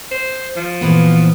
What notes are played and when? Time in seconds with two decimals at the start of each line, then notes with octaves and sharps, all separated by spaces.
0.11 C5
0.57 F3
0.81 A#2 E3 B3